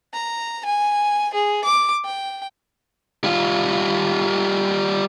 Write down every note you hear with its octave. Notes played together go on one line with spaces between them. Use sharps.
A#5
G#5
G#4
D6
G5
G3 F4